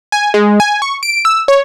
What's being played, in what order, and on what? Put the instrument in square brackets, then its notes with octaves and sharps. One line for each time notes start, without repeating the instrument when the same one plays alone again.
[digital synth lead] G#5
G#3
G#5
C#6
D7
E6
C#5